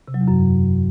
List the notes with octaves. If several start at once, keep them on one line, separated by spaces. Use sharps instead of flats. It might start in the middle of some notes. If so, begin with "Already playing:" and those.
C3
F#3
E2
F#2